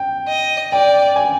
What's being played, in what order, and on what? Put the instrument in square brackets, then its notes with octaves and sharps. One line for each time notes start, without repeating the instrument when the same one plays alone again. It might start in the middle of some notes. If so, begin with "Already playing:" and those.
Already playing: [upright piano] G5
[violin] D#5
[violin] D5 [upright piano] G5
[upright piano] G#5